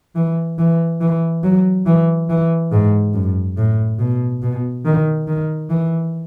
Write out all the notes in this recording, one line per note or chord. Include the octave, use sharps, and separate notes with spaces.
E3
E3
E3
F#3
E3
E3
G#2
F#2
A2
B2
B2
D#3
D#3
E3